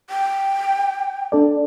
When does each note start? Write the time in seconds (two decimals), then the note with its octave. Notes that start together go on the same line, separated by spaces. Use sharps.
0.10 G5
1.32 D4 A4 D5